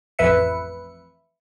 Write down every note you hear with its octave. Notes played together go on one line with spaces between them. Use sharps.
A1 F2 B4 E5 C#7